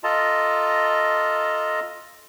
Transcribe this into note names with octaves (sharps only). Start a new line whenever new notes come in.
F4 A4 D#5 A5 A#5